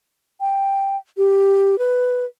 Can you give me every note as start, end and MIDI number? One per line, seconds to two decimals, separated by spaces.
0.40 0.97 79
1.17 1.78 67
1.78 2.25 71